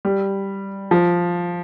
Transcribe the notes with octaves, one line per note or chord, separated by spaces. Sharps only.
G3
F3